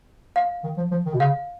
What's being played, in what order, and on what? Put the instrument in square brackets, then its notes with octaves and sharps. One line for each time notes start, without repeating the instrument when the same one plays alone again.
[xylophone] F5
[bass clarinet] D#3
F3
F3
D#3
B2
[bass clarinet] C#3 [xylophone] F5